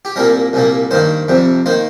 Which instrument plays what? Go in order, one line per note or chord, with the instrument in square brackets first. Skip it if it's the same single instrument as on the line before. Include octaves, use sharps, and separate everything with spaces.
[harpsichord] G4
C2 A#2 G3 A#3 A#4
C2 A#2 G3 A#3
G2 D#3 A#3 C5
F2 C3 G3
D#3 A#3 C5